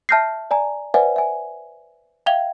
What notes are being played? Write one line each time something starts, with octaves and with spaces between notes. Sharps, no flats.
E5 A5 F6 G6 A#6 C7
D5 G#5 A#5
B4 C5 D5 E5 F#5 G#5
E5 G#5
E5 F5 G5 G#6 F7 G7